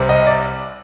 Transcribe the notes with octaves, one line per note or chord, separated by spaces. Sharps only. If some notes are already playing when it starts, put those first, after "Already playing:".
Already playing: C2 C3 G3 C4
D#5
D5